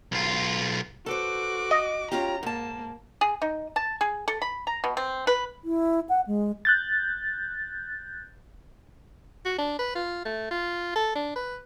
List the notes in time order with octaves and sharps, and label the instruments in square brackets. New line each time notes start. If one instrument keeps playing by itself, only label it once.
[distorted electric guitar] B1 F4
[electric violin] F#4 D6 [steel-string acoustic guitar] A4 B4 C5
[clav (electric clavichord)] D#5
[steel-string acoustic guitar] C#4 F4 G4 [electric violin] A#5
[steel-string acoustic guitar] G#2 A5 [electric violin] A#3
[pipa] G#4
D#4
A5
G#4
A4
B5
A#5
B2
C4
B4
[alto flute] E4
F#5
G#3
[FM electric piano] F#6 G6 A6
[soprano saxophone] F#4
D4
B4
F4
A3
F4
A4
D4
B4